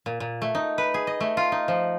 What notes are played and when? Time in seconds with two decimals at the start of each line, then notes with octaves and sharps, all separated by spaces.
0.06 A#2
0.20 A#2
0.42 A3
0.55 D#4
0.78 B4
0.94 G#4
1.07 D#5
1.20 A3
1.37 F4
1.52 D#4
1.68 F3